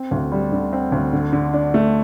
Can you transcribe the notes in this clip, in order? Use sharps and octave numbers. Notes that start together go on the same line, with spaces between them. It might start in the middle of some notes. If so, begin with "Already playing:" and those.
Already playing: C4
D2
G3
D3
C4
D2
D3
D3
D4
A3